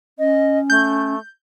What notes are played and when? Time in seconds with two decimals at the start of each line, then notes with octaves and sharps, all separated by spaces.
0.19 C#4 D#5
0.70 A3 G6